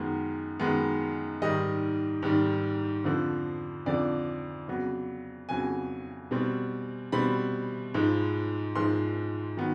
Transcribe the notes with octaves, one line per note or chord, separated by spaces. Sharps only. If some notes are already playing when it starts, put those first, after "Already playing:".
Already playing: F#2 D#3 G#3 B3
F#2 D#3 G#3 B3
G#2 D#3 G3 D#5
G#2 D#3 G3
F2 D3 F3
F2 D3 F3 D5
F2 C#3 F#3 B3
F2 C#3 F#3 B3 G#5
B2 G3 C4
B2 G3 C4 B5
G#2 F3 G#3
G#2 F3 G#3 C6
D#3 F#3 B3